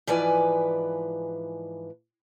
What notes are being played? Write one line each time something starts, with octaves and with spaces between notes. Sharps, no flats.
G#2 E3 F3 B4 D5 G#5